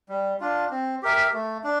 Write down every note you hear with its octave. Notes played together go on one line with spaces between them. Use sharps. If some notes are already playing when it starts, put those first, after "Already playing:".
G3
D4 F4
C4
G4 A#4 E5
A3
D4